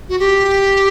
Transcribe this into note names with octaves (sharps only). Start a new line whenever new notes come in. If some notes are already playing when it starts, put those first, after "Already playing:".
F#4
G4